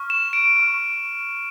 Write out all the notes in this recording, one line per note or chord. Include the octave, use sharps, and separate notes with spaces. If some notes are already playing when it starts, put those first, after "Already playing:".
Already playing: C#6 F6
E7
D7
C#6 F6